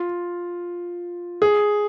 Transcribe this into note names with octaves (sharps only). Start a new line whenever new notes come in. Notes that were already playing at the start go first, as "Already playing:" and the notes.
Already playing: F4
G#4